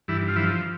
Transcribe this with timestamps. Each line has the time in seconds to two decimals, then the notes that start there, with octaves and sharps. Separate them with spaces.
0.08 G2 E3 E4
0.28 F4
0.36 E3 F3 E4